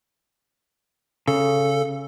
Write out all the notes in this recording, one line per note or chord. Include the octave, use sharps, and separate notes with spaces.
C#3 A4